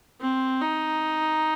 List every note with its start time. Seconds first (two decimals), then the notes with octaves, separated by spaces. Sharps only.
0.21 C4
0.62 D#4